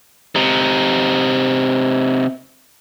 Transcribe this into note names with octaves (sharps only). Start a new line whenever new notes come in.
C3 D#4